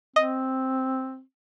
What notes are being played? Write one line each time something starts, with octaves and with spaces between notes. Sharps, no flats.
C4 D#5